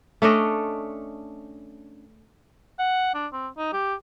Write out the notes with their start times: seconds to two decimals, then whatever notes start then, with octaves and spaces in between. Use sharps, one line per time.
0.22 A3 C#4 D4 D#5
2.79 F#5
3.14 D4
3.32 C4
3.58 D#4
3.73 G4